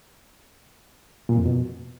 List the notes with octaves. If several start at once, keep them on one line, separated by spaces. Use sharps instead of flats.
A#2
F2
B2